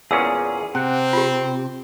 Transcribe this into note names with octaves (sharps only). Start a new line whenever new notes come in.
E2 A#2 C#4 G#4 E6
C3 C4 F#5
F4 G4